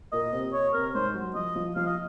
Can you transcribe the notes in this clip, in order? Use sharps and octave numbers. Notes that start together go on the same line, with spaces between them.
A#2 A#3 D#5
C3 C4
C#5
C3 C4 A#4
G#2 G#3 C5
F#3
F3 F4 D#5
F3 F4
F3 F4 F5
D#5